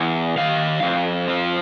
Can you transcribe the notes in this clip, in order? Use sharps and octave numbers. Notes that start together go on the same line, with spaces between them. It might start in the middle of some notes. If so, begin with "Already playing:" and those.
Already playing: E2
D#3 F5
F2
F3